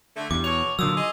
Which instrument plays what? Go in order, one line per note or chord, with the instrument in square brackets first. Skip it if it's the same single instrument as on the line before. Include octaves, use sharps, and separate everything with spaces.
[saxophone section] D3 A3
[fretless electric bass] E2 [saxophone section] G2 [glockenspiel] D6
[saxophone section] B2 C#5 [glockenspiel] F7
[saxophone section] A#2 [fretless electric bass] D3 F#3 [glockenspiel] D#6 E6
[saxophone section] F4 G#4 D#5